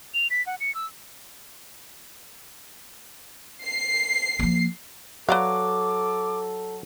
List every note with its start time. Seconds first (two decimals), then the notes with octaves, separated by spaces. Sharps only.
0.14 F7
0.30 B6
0.47 F#5
0.60 C#7
0.75 E6
3.64 C7
4.39 F3 A#3
5.29 F#3 A4 B4 D5 F5 D6